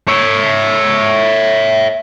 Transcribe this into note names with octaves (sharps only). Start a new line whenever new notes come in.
C#5 E5